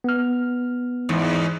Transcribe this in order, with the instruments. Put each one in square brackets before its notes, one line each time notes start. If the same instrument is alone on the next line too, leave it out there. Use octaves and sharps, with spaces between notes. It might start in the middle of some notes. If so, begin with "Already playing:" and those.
[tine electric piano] B3 F6
[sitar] E2 G#2